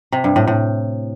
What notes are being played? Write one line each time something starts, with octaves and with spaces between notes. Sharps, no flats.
C3
G2
A2
A2